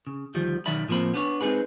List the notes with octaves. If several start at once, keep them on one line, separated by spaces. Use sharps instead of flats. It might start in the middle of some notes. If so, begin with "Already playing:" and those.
C#3
D2 D#3 F3 G3
B1 D#3 F#3 D5 E5 B5
A2 F3 A#3 C4 B5
B3 D4 C#5
G#3 C4 D#4 G#4 B4